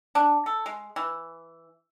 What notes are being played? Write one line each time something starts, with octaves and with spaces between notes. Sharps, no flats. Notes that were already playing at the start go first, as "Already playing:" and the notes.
D4
A4
G#3
E3